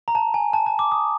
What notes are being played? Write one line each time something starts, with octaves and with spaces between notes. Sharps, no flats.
A#5
A5
G#5
A5
A5
D6
D#6